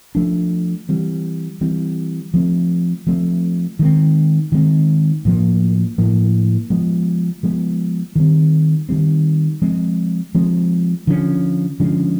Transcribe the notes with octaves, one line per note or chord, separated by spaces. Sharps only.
F3 A3 D4
E3 G3 C4
E3 G3 C4
F3 A3 C4
F3 A3 C4
D#3 G#3 C4
D#3 G#3 C4
A2 F3 A#3
A2 F3 A#3
F3 G#3 B3
F3 G#3 B3
D#3 G3 C4
D#3 G3 C4
F3 G#3 C4
F3 G#3 C4
D3 F3 G#3 C#4
D3 F3 G#3 C#4